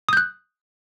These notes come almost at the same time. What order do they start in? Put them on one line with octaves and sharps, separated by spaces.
D#6 G6 F#6